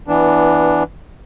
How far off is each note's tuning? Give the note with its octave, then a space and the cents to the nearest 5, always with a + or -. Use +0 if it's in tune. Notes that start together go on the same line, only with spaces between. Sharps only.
E3 +0 B3 -15 D4 +0